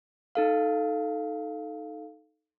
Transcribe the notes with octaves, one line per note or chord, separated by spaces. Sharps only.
D#4 A4 F5